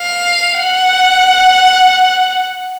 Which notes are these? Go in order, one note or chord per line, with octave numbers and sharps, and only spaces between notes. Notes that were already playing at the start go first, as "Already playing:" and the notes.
Already playing: F5
F#5